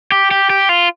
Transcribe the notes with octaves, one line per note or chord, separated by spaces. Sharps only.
G4
G4
G4
F4